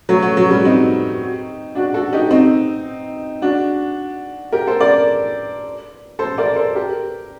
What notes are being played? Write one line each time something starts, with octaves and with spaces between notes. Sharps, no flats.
F#3 A3
F#3
F#3
G3
C4 D#4
D4 F#4
F#4 A4
D#4 G4
C4 D#4
D4 F#4
G4 A#4
A4 C5
A#4 D5
A4 C5
A#4 D5
A4 C5
G4 A#4